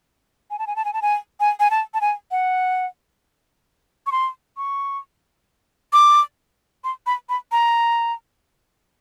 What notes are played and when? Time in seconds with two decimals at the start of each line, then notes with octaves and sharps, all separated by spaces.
0.51 G#5
0.59 A5
0.67 G#5
0.76 A5
0.85 G#5
0.93 A5
1.02 G#5
1.40 G#5
1.60 G#5
1.71 A5
1.94 A5
2.01 G#5
2.31 F#5
4.07 C#6
4.12 C6
4.57 C#6
5.93 D6
6.84 C6
7.06 B5
7.29 B5
7.52 A#5